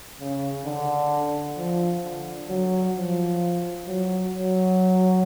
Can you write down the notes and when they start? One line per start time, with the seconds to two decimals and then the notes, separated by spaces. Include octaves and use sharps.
0.20 C#3
0.66 D3
1.57 F3
2.03 D3
2.50 F#3
2.96 F3
3.88 F#3
4.34 F#3